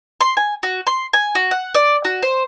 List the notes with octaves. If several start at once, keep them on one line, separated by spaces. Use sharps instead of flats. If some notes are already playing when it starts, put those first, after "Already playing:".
C6
G#5
F#4
C6
G#5
F#4
F#5
D5
F#4
C5